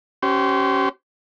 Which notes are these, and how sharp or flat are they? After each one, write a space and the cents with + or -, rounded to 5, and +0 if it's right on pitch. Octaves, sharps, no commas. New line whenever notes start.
C#4 +0 G4 -35 C5 -15